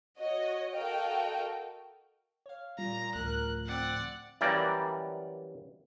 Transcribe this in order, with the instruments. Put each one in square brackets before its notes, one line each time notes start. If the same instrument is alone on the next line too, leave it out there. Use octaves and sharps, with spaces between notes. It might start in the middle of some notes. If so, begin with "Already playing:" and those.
[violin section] F#4 C#5 D#5
F#4 A4 A#4 D#5 F5 G5
[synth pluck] C#5 F5
[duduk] A#2 [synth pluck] G3 F4 [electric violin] A#5
[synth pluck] D2 [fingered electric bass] A2 F3 [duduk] A#4 [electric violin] F#6
[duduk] C4 [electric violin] D5 F#5
[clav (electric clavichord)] F#2 E3 G3 A#3 D5